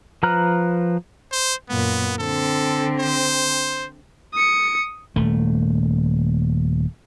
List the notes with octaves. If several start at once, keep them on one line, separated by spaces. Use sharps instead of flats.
F3 B4 A#5 F6 F#6
C5
F#2 A#2 B3
D3 C4 A4
C5
D#6 C#7
D#1 A3